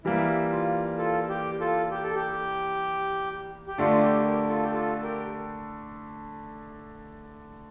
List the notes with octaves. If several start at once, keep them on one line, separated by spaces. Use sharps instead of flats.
E3 G3 A#3 E4
F4
F4 A4
G4
F4 A4
G4
A4
G4
G4
D3 A3 D4 F4
F4
G4
G4 A#4
F4 A4
G4
F4 A4
G4 A#4